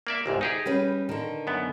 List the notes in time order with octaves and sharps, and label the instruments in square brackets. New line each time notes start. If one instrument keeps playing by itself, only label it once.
[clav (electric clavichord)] A#3 D5 E5
G1 C2 G#2
D#4 G4 G#4
[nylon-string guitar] G3 C#4 B4
D3 D#3
[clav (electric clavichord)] F#2 B3